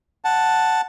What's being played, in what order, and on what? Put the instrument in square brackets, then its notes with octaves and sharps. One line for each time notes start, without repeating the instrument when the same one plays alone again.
[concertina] F#5 A5